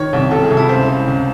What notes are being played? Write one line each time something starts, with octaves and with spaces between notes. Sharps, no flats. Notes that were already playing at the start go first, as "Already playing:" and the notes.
Already playing: D#3 C#5
C2
C2 A4
G#4
C2
E4
C#2 C5
C#2
C#2